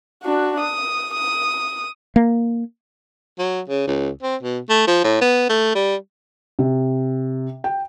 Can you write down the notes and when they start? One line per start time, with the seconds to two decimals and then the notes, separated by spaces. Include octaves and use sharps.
0.24 D4 F#4
0.60 D#6
1.15 D#6
2.16 A#3
3.39 F#3
3.69 C#3
3.87 C#2
4.23 C4
4.43 B2
4.69 A3
4.87 F3
5.04 A2
5.21 B3
5.49 A3
5.75 G3
6.59 C3
7.64 G5